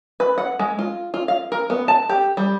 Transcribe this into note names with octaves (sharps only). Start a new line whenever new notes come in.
B4
F#5
G#3
F4
F4
F5
A#4
B3
A5
G4
G3